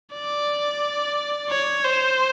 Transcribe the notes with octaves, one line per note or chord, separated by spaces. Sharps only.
D5
C#5
C5